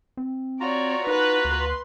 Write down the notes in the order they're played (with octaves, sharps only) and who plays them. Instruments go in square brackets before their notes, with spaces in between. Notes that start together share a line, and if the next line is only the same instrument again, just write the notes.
[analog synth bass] C4
[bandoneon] F4 F#4 A#5 [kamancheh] C#5 D5
[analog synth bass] D#4 [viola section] B4 [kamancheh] F#5 F#6
[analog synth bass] D2 [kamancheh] C6